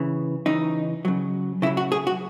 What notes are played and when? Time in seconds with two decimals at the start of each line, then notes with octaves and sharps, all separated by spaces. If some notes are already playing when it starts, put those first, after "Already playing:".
Already playing: C#3 E3
0.46 C#3 E3 D#4
1.05 C#3 F#3
1.62 C#3 E4
1.67 F#3
1.77 F#4
1.92 G#4
2.07 F#4